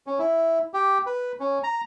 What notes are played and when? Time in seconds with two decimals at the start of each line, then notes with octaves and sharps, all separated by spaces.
0.07 C#4
0.19 E4
0.74 G4
1.06 B4
1.40 C#4
1.64 A#5